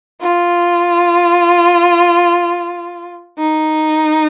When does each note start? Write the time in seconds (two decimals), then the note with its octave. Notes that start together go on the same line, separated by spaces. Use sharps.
0.21 F4
3.38 D#4